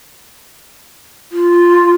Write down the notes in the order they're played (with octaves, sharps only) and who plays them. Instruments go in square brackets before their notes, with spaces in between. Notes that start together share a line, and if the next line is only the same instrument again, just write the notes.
[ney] F4